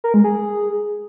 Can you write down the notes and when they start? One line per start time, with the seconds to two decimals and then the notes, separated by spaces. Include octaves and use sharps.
0.04 A#4
0.14 G#3
0.24 G#4